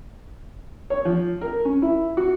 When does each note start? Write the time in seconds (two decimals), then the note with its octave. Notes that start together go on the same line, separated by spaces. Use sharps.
0.90 C#5
1.05 F3
1.41 A#4
1.65 C#4
1.82 E4
2.17 F#4